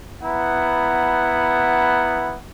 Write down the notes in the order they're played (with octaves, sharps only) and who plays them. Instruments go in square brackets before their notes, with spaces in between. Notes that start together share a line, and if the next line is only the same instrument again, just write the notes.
[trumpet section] B3 E4 F#5 A#5